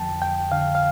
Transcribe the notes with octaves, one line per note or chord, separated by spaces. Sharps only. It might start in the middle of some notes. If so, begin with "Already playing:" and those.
Already playing: F2 D3 F3 G5 A5
F2 G5
D3 F5
F5